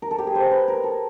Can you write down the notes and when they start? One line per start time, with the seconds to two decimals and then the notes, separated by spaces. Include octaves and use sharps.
0.02 A#4
0.11 A4
0.18 G4
0.27 G#4
0.35 C5
0.51 B4
0.68 A#4
0.84 A4